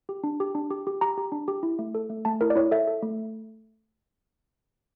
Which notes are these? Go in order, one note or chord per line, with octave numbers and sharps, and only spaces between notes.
G4
D4
G4
D4
G4
G4
G4 A#5
G4
D4
G4
E4
A3
A4
A3
A3 A5
E4 A#4
D5
E4 C#5
A4 E5
A4
A3